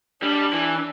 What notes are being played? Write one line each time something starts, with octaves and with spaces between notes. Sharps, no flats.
G3 D4
E3